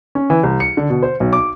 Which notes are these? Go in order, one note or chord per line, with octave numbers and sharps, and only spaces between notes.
C#4
E3
C2
C#7
D3
B2
C5
B1
D6